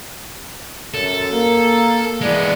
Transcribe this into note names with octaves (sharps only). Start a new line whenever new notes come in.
F#2 A4
A#3
E3 G#3 B3 D5